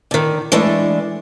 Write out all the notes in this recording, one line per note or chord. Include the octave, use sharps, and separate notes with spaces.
D3 D#3
E3 G#3 A3 D4